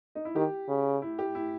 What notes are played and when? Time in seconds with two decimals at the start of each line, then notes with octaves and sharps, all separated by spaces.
0.15 D#4
0.25 E4
0.36 D#3 G4
0.68 C#3
1.02 E4
1.19 G4
1.35 E4